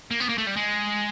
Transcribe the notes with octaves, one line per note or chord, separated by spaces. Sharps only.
A#3
B3
A#3
A3
G3
G#3